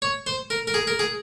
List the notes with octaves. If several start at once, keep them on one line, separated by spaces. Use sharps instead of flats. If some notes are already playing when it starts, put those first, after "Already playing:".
C#5
C5
A#4
A#4
G#4
A#4
G#4